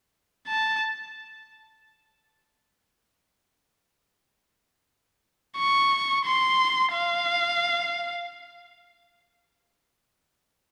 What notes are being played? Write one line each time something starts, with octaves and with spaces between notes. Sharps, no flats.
A5
C#6
C6
F5